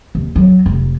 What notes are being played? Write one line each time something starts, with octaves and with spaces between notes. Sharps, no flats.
D#2
F#3
F1